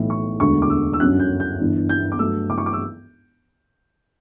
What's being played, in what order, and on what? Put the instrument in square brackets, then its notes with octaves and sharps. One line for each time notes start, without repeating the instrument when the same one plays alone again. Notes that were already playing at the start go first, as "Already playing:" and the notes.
Already playing: [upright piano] B1 A2 E3
C#6
E1 D2 D3 C#6
D6
E6
E6
G1 F#2 D3 F#3 C#4 F#6
G6
G6
G1 G2 E3
G6
D6
G2 F#3 A3 E6
D6
C#6
D6
E6